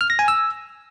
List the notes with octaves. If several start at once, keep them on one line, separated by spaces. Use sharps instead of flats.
F6
A#6
G#5
E6